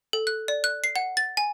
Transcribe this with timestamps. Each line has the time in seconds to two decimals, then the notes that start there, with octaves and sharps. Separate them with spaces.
0.13 A4
0.27 F#6
0.48 D5
0.64 F#6
0.84 C7
0.96 F#5
1.17 A6
1.37 G#5